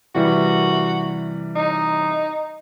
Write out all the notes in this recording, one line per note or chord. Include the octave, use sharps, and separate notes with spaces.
C3 E3 G3 F#4
D#4